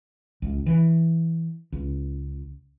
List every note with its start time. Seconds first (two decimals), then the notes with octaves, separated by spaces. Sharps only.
0.42 C#2
0.66 E3
1.72 C#2